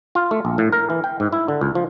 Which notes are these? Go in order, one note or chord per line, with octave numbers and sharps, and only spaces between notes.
F4
A3
A#1
A2
A#4
E3
G5
G#2
E4
D3
C#2
F3